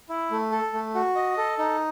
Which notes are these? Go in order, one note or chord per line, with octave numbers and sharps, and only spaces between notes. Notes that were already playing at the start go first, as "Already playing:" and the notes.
E4
A3
A4
A3
F#4
D#5
A4
D#4